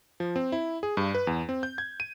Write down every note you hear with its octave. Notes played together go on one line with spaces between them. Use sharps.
F3
C4
E4
G#4
G2
B4
E2
C4
G6
G#6
D#7